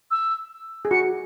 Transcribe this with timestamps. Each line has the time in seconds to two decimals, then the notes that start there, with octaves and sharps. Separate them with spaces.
0.11 E6
0.85 G#4
0.91 F#4 C#7